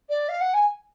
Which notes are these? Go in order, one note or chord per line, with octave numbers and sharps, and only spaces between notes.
D5
F5
F#5
G#5